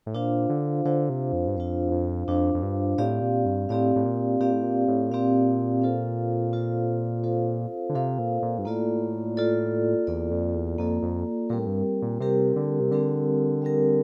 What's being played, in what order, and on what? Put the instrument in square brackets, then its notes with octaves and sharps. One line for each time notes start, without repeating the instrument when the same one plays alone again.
[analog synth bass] A2
[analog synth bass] A#2 [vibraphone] D4 F4 C5 F5
[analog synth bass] D3
[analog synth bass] D3 [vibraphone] D4 F4 C5 F5
[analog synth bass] C3
F2
G2
[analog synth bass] F2 [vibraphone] D4 F4 C5 F5
[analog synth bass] E2
F2
[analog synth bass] F2 [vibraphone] D4 F4 C5 F5
[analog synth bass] F2
G2
[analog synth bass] A2 [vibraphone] C4 G4 D5 F5
[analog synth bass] A#2
G2
[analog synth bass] A2 [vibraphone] C4 G4 D5 F5
[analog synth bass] A2
A#2
[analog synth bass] A#2 [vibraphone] C4 G4 D5 F5
[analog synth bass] A2
A#2
A2
[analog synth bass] A#2 [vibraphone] C4 G4 D5 F5
[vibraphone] F4 A4 C5 F5
F4 A4 C5 F5
F4 A4 C5 F5
[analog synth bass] D3
[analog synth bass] C3 [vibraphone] F4 A4 C5 F5
[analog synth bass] A#2
A#2
G2
[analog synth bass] A2 [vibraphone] A#3 F4 A4 D5
[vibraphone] A#3 F4 A4 D5
[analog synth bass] E2 [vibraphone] A#3 F4 A4 D5
[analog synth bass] F2
E2
[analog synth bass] F2 [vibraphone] A#3 F4 A4 D5
[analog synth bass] F2
[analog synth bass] A#2 [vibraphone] G3 C4 G4 A#4
[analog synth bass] A2
G2
A#2
[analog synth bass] C3 [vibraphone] G3 C4 G4 A#4
[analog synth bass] D3
C3
[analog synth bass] D3 [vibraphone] G3 C4 G4 A#4
[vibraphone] G3 C4 G4 A#4